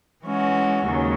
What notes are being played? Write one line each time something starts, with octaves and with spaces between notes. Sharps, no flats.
E3 G#3 C#4 F#4
D#2 C#3 F#3